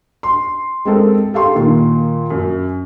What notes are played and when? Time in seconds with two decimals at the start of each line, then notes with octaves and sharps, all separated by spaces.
0.23 C6
0.85 G#3 C4 A4 A#4
1.33 G4 A4 F5 C6 C#6
1.55 A#2 D#3 A#3
2.30 F#2